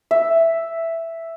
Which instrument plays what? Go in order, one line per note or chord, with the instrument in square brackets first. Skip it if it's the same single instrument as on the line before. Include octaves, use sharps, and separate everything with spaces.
[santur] E5